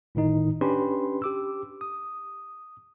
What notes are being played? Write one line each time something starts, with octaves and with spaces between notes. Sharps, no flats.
G1 A2 D#3 D#4 D#5
C#4 D4 G4 B4 B5 C6
G4 D6 E6
D#6